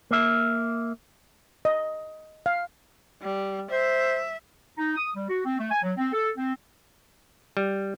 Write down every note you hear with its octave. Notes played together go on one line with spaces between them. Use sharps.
A#3 E5
D#5
F5
G3
C5 E5
D#4
D#6
G3
F#4
C4
A3
G#5
F#3
C4
A4
C4
G3